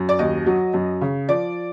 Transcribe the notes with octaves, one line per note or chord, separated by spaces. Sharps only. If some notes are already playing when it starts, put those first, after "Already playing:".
Already playing: F#2
D5
D#2 D#5
F#3
F#2
C#3
F3 D5